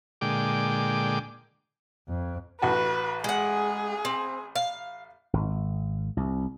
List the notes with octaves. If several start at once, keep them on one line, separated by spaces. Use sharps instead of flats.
A#2 D3 G#3 G5 D6
F2
A1 F#4 B4 A5
G#3 G#4 F#5
C4
F5
G#1
C2